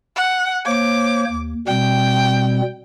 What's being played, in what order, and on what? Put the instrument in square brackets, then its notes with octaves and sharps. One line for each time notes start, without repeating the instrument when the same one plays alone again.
[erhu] F#5
[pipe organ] A#3 C5 C#5 [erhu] D6
[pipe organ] D#2
[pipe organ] B2 G3 C4 [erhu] G5